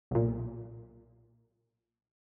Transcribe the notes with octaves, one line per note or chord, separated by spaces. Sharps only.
B1 A#2